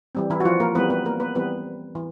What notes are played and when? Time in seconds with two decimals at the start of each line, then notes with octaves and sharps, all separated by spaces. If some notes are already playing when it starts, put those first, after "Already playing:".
0.15 E3 G3 C4
0.30 E3 E4
0.40 F#4
0.45 F3 F4
0.60 A#3 A#4
0.75 E3 G3 B3 C4 B4
0.90 B3 B4
1.05 A#3 A#4
1.20 B3 B4
1.35 E3 G3 B3 C4 B4
1.95 E3